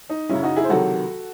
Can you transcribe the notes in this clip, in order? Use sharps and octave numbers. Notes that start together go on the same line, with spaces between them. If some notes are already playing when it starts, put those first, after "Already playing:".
D#4
F#2 C#3 F#3 C#4 E4
D#4 F#4
E4 G#4
C5
C#2 C3 D#3 F#3 F#4 A4